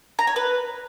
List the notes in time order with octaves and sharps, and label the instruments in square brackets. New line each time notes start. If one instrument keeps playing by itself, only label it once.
[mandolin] A#5
C#5
B4